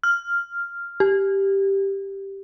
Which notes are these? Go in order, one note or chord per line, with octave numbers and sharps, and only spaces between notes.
F6
G4